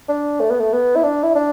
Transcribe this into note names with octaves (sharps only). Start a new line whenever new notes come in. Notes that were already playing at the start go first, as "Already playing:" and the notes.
D4
A3
B3
A3
B3
E4
D4
E4
D4